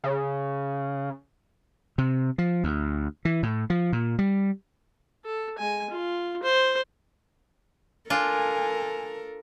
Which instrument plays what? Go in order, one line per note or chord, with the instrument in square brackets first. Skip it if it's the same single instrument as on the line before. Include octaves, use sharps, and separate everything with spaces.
[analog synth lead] C#3
[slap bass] C3
F3
D2
E3
A2
F3
A#2
G3
[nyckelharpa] A4
G#3 G#5
F4
C5
[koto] D4 F4 [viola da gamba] A4 A#4 [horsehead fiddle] G#5